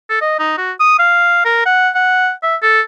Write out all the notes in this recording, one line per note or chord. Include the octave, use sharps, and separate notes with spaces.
A4
D#5
D#4
F#4
D#6
F5
A#4
F#5
F#5
E5
A4